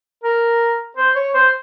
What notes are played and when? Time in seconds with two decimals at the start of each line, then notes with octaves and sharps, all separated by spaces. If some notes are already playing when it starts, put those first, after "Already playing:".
0.24 A#4
0.97 C5
1.16 C#5
1.34 C5